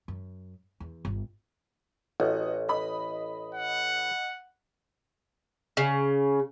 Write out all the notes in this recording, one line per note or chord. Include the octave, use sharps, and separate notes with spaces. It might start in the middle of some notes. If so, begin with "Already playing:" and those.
F#2
E2
G1
A1 F#4 D#5
D#5 B5
F#5
C#3